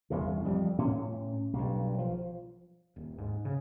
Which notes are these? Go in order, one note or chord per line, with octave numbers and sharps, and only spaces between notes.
G1 E2 C3
F2 G3
A2 C#4
B1 G2
F3
D#1
G#2
C#3